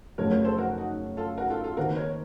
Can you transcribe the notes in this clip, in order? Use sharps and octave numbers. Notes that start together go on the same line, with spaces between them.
F#2 C#3 F3 A3 A#4 C#5
A#4 C#5
A4 C5
F#4 A#4
D#4 F#4
F4 A4
F#4 A#4
F4 A4
F4 A4
D#3 A#3 D#4 F#4 A4 A#4 C5
A#4 C#5